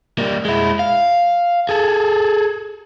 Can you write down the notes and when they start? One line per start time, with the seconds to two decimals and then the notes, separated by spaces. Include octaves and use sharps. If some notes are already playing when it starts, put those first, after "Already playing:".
0.18 G3 A#3
0.45 G#3 E4
0.79 F5
1.69 G#4 A4